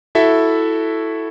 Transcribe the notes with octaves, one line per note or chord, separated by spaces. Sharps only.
E4 F#4 A4 E5